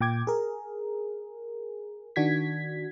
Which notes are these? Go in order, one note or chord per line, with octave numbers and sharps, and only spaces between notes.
A#2 G5 D6 G#6
G#4 A#4
D#3 D4 F#4 G#6 B6